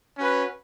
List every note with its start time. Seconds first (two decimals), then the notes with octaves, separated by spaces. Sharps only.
0.18 C#4 F#4 B4